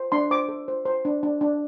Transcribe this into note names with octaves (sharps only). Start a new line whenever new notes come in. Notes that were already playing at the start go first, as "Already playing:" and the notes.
Already playing: C5
D4 C6
C5 D6
A4
C5
C5
D4
D4
D4